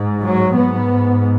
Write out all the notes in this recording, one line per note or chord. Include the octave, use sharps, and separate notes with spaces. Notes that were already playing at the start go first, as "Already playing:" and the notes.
Already playing: G#2
F#3
G#2 B3